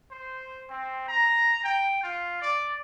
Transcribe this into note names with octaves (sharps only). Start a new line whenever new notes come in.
C5
C4
A#5
G5
F4
D5